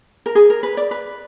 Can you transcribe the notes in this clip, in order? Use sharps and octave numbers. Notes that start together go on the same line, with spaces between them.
A#4
G#4
A#4
B4
D5
B4